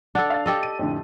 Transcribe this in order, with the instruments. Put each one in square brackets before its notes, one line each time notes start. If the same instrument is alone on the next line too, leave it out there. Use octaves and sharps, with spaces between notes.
[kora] D4 A4 [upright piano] F#5
[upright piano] F5 A6
[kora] G4 A4 D#5
[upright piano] D#7
F2 A2 D3